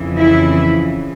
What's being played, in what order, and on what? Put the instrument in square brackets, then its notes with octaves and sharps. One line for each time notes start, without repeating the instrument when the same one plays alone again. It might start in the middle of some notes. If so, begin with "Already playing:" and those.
Already playing: [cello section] F2 C#3 E3
E4